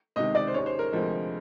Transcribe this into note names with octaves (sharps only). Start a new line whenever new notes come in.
C#2 C3 D#3 D#5
D5
C5
D#2 D#3 G#3 C#4 C#5
C5
A#4
D2 C3 F3 G#3